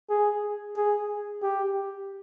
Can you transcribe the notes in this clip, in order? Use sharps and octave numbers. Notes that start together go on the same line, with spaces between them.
G#4
G#4
G4